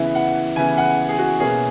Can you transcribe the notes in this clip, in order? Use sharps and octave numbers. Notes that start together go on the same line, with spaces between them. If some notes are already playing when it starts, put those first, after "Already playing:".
Already playing: C#3 E3 B3 E4 E5
F#5
C#3 E3 B3 E4 G#5
F#5
G#4
F#4
B2 A#3 C#4 E4 G#4